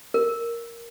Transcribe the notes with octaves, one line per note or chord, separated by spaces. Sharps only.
A#4